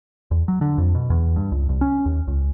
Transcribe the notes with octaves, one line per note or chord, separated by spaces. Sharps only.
E2
F#3
D3
F2
B2
E2
G2
C#2
C2
C#4
D#2
C#2